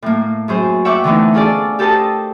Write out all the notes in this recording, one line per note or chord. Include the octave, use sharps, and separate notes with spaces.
A2 A#3
F#2 G#4 C5
C#5 E5 F#5 G5 C#6 D6
D3 E3 A3 B3 D#4 E4
C#4 F4 G#4 A4 D5
G4 A4 A#4 C5 A5 D#6